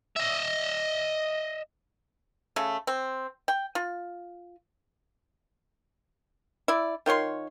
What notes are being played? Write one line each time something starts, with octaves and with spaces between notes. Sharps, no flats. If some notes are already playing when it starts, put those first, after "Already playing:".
D#5 E5
C#3 A3
C4
G5
F4
E4 D5
D#3 F4 C#5 C6